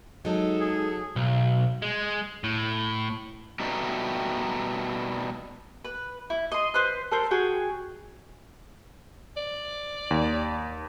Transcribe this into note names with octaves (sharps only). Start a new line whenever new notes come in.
F#3 G#3 D#4 A4
G#4
B1
G#3
A2
B2 G3 A3 D#4
B4
E4
D#5 C6
B4 C5 C6 F#6
A4 A#4 C5
F#4 G#4 G5
D5
D#2